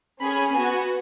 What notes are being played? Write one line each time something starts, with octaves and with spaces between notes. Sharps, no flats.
C#4 G#4 B5
B3 F#4 G#5